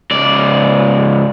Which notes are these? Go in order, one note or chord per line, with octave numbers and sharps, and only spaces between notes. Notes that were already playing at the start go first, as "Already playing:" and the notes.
C#2 D5